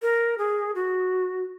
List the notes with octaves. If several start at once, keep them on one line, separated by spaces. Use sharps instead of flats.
A#4
G#4
F#4